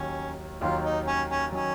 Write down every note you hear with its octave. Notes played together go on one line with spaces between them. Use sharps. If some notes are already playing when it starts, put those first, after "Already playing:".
Already playing: D#2 D#3 F#3 C#4
D#2 D#3 F#3 F4
D#4
C#4
C#4
D#3 F#3 C#4